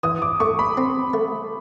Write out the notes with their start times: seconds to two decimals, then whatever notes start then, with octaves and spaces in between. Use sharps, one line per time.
0.03 E3 D#6
0.22 D6
0.40 A3 C#6
0.59 B5
0.77 C4
1.14 A3